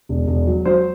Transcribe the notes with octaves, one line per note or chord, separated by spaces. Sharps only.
E1
E1
F#3
F#3 C5